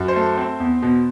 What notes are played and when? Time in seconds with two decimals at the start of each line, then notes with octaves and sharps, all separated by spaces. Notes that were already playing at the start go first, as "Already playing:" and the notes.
Already playing: F#2
0.08 C5
0.16 A3
0.37 C4
0.60 E2
0.82 B2